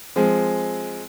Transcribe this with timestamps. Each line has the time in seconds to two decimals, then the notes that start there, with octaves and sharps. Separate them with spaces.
0.16 F3 G#3 C4